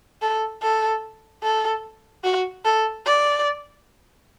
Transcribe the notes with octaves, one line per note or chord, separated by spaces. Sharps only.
A4
A4
A4
F#4
A4
D5